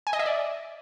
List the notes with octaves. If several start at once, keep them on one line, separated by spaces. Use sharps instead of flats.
G#5
D#5
E5
D5